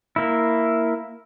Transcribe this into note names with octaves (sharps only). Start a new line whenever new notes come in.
A#3 E4